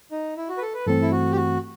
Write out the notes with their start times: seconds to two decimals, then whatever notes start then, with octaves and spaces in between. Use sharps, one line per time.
0.11 D#4
0.37 E4
0.49 F#4
0.57 B4
0.62 A4
0.74 B4
0.86 G2 E3 A3 C4 A4
1.02 E4
1.11 F#4
1.32 G4
1.36 F#4